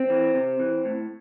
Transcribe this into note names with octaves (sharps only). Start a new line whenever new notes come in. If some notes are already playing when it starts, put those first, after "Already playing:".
Already playing: C4
E3
C3
E3
A2